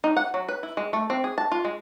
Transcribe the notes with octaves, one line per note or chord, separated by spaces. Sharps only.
D#4
F#5
F#3
B4
E4
G#3
A3
C4
G#4
A5
F4
G#3